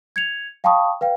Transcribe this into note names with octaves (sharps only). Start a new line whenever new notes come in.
G#6 C#7 F7
F5 G5 A5 B5 C#6 D#6
B4 F5 G5